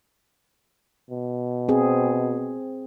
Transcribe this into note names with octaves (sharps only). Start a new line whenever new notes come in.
B2
C4 G#4